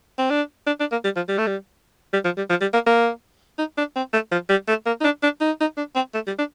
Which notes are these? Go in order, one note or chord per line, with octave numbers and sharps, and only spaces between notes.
C4
D4
D4
D4
A#3
G3
F3
G3
A3
G3
G3
F3
G3
F3
G3
A#3
A#3
D#4
D4
C4
A3
F3
G3
A3
A#3
D#4
D4
D4
D#4
D#4
D4
C4
A3
G3
D4